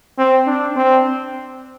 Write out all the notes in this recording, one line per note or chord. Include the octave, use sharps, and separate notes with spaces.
C4
D4
C4